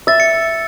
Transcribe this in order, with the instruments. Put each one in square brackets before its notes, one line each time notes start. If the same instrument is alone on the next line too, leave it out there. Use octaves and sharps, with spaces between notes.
[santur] E5 [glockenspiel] A6
[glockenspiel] C#7